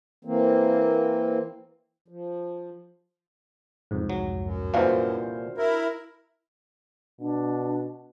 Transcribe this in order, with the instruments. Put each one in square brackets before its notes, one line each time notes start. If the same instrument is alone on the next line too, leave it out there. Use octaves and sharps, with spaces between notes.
[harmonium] E3 A#3 C4
F3
[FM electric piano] C2 F2 G#2
[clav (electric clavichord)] F#3
[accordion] F#2
[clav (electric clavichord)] C2 A#2 E3 [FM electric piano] D4 F#4 [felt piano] C5 F5
[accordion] E4 A#4
[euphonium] B2 [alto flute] D4